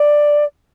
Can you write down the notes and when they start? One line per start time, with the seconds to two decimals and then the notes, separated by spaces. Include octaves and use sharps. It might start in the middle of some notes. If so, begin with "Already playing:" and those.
Already playing: D5